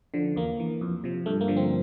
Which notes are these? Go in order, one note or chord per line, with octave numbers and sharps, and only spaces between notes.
D3 F3
E2 A#3
E3
F2
C3 F3
G2 A3
A#3
D3 F3
C4